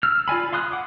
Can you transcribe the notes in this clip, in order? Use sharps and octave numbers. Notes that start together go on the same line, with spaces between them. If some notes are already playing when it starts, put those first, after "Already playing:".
E6 F6
F4 D5 G#5 B5
F5 C6 D#6 F#6
F#5 D6